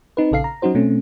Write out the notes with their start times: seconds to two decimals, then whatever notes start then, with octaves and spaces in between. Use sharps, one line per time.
0.17 C4 D#4 B4
0.32 A#1 C#3 A4 F5 C7
0.44 A#5
0.62 F#3 C#4 D#4 F#4 C5
0.75 B2 A3 C4 C#4